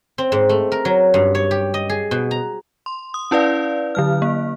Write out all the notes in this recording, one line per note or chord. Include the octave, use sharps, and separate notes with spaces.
C4
G#2
A3
A#4
F#3
G2
C#5
G4
D#5
G#4
B2
A#5
C6
D#6
C#4 E4 B4 D5 F5
D3 F#3 F6
A#3